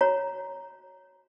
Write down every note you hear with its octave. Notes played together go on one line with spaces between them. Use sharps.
F#4 C#5 A#5